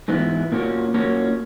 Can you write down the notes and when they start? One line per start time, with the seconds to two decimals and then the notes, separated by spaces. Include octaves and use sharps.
0.08 G#2 E3 G#3 B3
0.52 A#2 A#3 C#4 F#4
0.94 A#2 A#3 C#4 F#4